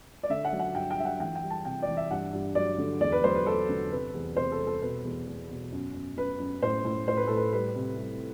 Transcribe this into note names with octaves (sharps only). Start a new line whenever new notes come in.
D5
D3 E5
F#5
F#3
F#5
G2 G5
G5
G2 E5
F#5
E3 G5
G5
G3
A5
C3 G5
D5
E3
E5
G2 F#5
G2
F#3 D5
D3
E2 D5
B4
F#3 C5
B4
F#3 A4
D3
C3 B4
E2
C3 C5
A4
G3
A4
B2 B4
E2
E2
B2
F#2
F#2
F#2 B4
F#2
A2 C5
A2
A2 C5
B4
A2 A4
B4
G3 B4
C3
G3